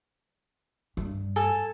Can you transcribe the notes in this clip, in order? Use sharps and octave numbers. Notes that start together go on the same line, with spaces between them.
G2
A4 G#5